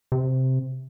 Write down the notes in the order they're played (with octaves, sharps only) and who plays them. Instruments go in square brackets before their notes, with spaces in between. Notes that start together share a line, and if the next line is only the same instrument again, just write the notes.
[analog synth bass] C3